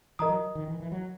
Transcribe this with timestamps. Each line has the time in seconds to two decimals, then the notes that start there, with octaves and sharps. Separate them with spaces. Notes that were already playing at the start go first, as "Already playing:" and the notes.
0.19 E3 A#4 D#5 A#5 D#6
0.29 F#3
0.55 D#3
0.68 E3
0.80 E3
0.92 F#3